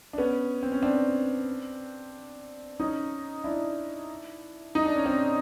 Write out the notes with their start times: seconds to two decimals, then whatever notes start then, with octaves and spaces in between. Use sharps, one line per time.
0.13 D4
0.18 B3 C#4
0.63 C4
0.72 C#4
0.82 C4 D4
2.80 C#4 D#4
3.44 D4 E4
4.75 D#4
4.85 D4
4.96 C#4
5.06 C4 D4